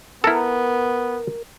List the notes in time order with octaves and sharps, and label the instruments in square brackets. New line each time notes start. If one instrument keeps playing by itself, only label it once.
[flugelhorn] B3 [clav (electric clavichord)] E4 A4 [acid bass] A#4